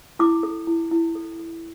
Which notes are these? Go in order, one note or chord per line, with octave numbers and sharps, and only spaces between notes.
E4 D6
A4
E4
E4
A4
A4